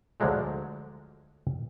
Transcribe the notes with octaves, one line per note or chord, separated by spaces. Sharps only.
D2 D3 F3 F#3 G#3 A3